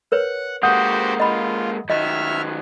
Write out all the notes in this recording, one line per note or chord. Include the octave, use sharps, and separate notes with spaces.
A#4 B4 C#5 F#5
G#3 A#3 F#4 G4 C5 F#5 D#6 G6
F4 D#5 B5
D#3 F#3 D#5 E5 F6